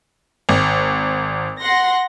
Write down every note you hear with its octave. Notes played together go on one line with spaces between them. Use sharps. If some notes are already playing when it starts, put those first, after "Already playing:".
G#1
F#5 C6 A#6